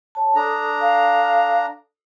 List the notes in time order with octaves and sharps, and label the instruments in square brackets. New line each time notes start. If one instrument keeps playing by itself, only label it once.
[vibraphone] C#5 A5
[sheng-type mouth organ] D4 A#5 [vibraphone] A4 D#6
[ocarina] F5